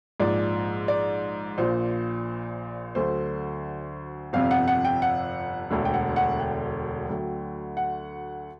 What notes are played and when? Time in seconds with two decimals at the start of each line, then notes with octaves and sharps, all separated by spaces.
0.20 A#1 G#2 F3 D5
0.88 D5
1.58 A#1 A#2 F3 C5
2.95 D2 D3 F#3 C5
4.33 G1 F2 C3 F5
4.51 F#5
4.68 F#5
4.85 G5
5.02 F#5
5.71 E1 D2 D3
5.85 G5
5.94 F#5
6.16 F#5
6.39 G5
7.09 D2 D3 F#3
7.77 F#5